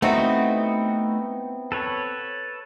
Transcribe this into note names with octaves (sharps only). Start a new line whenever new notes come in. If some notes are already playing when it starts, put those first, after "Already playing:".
A3 B3 C4 D#4 E4 F#4
A4 B4 C#5